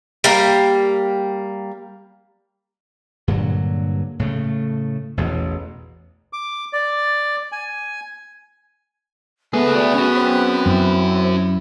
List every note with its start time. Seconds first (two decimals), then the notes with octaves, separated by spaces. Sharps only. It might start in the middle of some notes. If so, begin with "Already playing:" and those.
0.24 G3 A#3
3.28 G2 A#2 D3 F#3
4.19 A2 C#3 A3
5.17 A1 E2 B2
6.33 D6
6.73 D5
7.52 G#5
9.53 C#2 A3 B3 G#4 B4
9.74 F#4 D5
9.94 C#4 F#4
10.15 C4
10.66 F#2 E4